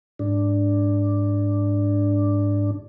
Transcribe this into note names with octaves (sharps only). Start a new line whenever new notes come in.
G#2 D4